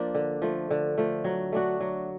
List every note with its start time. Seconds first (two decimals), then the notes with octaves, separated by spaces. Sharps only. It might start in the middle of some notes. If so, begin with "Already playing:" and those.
Already playing: F3 A#3 D4
0.15 D3
0.42 F3 A3
0.71 D3
0.98 F3 A3
1.24 F#3
1.52 A3 D4 F#4
1.80 F#3